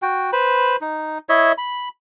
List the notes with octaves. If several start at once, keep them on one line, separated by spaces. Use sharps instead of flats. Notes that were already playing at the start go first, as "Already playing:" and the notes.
F#4 G5
B4 C5 B5
D#4
E4 C#5 D#5 E5
B5